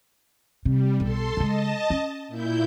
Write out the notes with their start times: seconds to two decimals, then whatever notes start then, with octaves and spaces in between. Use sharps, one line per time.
0.65 C3 G3
1.00 B1 A4 C6
1.37 C#3 G#3 D#5 A5
1.90 C#4
2.28 A#2 E4 G6